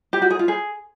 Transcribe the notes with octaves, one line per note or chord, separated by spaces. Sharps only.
G4
F#4
G#4
F4
G#4